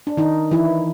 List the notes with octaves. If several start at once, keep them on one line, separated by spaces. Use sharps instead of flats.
D4
D#3 D#4
E3 E4